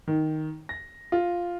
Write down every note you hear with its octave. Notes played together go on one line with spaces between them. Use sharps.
D#3
A#6
F4